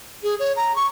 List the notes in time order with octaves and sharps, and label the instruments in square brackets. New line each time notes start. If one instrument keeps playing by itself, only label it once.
[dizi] G#4
C#5
A#5
C#6